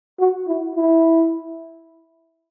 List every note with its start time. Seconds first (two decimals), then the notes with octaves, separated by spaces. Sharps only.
0.19 F#4
0.48 E4
0.76 E4